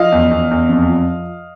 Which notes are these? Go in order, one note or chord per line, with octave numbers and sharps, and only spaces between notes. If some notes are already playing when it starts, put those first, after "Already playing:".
Already playing: F3 D#5 F5
E2
E2
E2
F2
F3